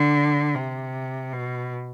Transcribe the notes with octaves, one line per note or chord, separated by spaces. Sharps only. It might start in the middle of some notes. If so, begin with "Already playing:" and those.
Already playing: D3
C3
B2